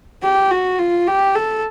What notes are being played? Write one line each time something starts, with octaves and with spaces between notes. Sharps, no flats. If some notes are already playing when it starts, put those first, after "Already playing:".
G4
F#4
F4
G4
A4